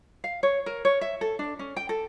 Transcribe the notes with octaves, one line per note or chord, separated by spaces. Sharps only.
F5
C#5
A#4
C#5
E5
A4
D4
C#4
G5
A4